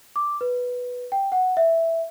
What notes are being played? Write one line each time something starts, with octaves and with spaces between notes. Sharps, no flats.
D6
B4
G5
F#5
E5